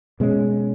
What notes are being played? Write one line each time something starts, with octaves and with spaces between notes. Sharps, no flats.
B2 G#3 C#4